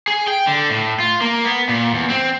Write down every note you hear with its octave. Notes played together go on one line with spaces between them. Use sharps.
G#4
G5
D3
A2
F4
A#3
B3
A#2
E2
C4